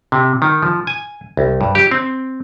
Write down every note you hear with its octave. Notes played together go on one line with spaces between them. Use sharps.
C3
D#3
F3
G#5
C2
G2
G4
C4